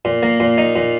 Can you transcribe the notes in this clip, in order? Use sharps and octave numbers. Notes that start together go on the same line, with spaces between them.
A#2
A#3
A#2
D#4
A#2